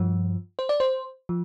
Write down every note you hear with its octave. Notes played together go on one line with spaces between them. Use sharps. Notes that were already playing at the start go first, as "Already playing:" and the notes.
Already playing: G2 F3
C5
D5
C5
F3